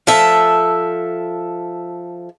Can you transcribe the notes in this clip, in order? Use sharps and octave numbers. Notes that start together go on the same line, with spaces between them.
F3 A4 E5